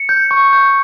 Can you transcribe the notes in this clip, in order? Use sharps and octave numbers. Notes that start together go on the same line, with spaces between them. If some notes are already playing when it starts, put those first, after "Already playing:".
Already playing: C#7
G6
C#6
G6